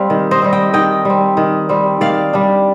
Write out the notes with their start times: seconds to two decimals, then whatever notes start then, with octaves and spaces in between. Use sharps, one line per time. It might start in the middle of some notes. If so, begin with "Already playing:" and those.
Already playing: G3 C4 F5 G5
0.10 D#3
0.31 C5 D#5
0.42 G3 C4
0.53 D#5 G5
0.73 D#3 D#5 G5
1.05 G3 C4
1.37 D#3
1.69 G3 C4
2.01 D#3 D5 F5
2.33 G3 D4